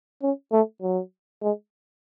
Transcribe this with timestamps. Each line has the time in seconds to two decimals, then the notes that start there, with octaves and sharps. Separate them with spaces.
0.22 C#4
0.52 A3
0.82 F#3
1.42 G#3